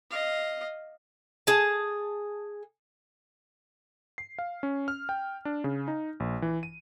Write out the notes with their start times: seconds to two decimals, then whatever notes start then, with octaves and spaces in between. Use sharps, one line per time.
0.11 D#5 F5
1.47 G#4 A5
4.18 C7
4.39 F5
4.63 C#4
4.88 F6
5.09 G5
5.45 D4
5.64 C#3
5.88 D#4
6.20 A#1
6.42 E3
6.63 D#7